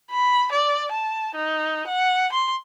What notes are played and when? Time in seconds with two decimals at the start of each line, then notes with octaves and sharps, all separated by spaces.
0.11 B5
0.52 D5
0.92 A5
1.35 D#4
1.87 F#5
2.33 C6